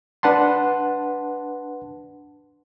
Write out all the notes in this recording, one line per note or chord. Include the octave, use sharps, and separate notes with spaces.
D4 B4 F#5 A5 C6